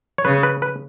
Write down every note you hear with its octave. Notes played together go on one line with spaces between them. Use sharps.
C#5
C#3 B4
B4
B4